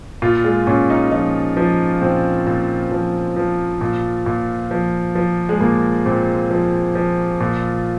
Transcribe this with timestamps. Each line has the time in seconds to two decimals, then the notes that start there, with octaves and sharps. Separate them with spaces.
0.22 A#2 F4
0.44 G#3
0.67 A#2 C#4
0.90 D#4
1.12 F3 D#4
1.57 F3
2.02 A#2 C4
2.46 A#2
2.91 F3
3.36 F3
3.81 A#2
4.26 A#2
4.71 F3
5.15 F3
5.49 G#3
5.60 A#2 A#3
6.06 A#2 C4
6.51 F3
6.95 F3
7.40 A#2